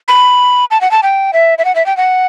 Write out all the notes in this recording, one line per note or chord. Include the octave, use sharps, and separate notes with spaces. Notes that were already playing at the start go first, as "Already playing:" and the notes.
B5
A5
F#5
A5
G5
E5
E5
F#5
E5
G5
F#5